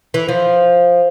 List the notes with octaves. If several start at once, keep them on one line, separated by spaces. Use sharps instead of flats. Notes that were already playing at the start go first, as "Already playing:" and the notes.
E3
F3